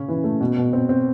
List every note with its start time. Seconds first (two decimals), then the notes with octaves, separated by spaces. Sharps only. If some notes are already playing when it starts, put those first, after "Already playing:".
Already playing: C#3 C#4
0.08 E3
0.24 A3
0.41 B2
0.57 B2
0.73 C4
0.89 C4